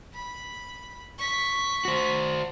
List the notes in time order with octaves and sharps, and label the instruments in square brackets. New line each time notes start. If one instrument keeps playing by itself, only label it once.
[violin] B5
C#6 B6
[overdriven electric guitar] F#4 C5